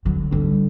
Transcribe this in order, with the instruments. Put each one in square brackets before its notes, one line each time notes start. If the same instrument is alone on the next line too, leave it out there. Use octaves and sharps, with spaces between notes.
[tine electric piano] D3 [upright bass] F#3
[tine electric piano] D3 [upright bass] G3